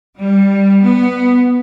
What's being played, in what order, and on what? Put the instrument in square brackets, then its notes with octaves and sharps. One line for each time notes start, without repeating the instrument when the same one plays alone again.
[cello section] G3
B3